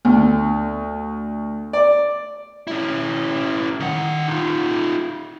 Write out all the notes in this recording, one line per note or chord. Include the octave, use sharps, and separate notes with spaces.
D2
D5
C#4 E4
D#3 F#5
D#4 F4